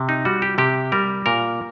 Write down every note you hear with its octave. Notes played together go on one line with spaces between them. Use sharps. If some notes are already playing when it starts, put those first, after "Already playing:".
Already playing: C3
D#4
G3 F#4
G4
C3 G4
G3 A#4
A#2 A#4